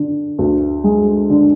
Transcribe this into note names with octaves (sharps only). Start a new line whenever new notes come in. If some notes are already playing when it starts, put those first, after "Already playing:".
Already playing: D3
D2
G#3
D3